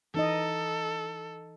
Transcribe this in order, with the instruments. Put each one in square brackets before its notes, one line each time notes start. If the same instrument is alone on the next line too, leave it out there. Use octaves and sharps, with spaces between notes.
[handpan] E3 D#4 D#5 [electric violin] A4